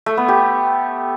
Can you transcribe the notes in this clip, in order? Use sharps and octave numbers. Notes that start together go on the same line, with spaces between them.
A3
B3
G4